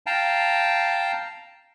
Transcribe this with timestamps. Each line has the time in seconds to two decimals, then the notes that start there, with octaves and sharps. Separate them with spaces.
0.06 F5 G5 A5 A#5